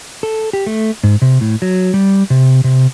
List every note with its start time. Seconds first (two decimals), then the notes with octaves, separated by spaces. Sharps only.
0.23 A4
0.53 G4
0.67 A3
1.04 G#2
1.22 C3
1.41 A2
1.62 F#3
1.94 G3
2.30 C3
2.64 C3